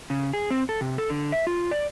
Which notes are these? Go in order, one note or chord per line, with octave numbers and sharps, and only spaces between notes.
C#3
G#4
C4
A4
C3
A4
D3
E5
F4
D5